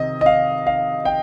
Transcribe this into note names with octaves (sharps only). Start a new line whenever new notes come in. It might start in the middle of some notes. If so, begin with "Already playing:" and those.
Already playing: C3 D#3 D#5
D#5
F5
F5
G5